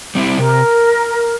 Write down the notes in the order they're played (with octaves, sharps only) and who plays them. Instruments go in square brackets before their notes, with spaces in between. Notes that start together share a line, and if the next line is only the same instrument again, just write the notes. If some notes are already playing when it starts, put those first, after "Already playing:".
[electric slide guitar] G3 C4 E4
[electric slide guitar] C3 [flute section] A#4